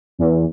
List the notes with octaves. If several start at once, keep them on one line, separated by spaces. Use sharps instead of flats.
E2